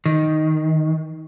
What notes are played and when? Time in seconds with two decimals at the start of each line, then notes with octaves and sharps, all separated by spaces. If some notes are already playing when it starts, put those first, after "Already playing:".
0.06 D#3